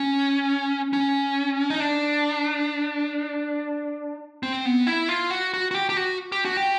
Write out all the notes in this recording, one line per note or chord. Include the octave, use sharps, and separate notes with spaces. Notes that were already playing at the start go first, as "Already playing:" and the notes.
Already playing: C#4
C#4
D#4
D4
C4
B3
E4
F4
F#4
F#4
F#4
G4
G4
F#4
G4
F#4
G4